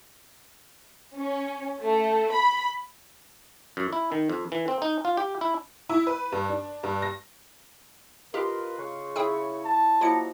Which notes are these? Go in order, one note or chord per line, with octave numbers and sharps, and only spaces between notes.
C#4
A3
B5
F#2
E4
D#3
F2
E3
C4
D#4
F4
G4
E4
E4
B4
G2
D4
G2
A#6
F4 G4 A#4 B4 D#5 C6
C#3 C#6
E4 G#4 C#5 G5 E6
A5
F3 F#3 A#3 E4 D#5 A#5 C#7